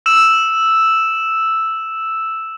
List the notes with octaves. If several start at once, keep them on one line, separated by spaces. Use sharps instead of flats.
E6 E7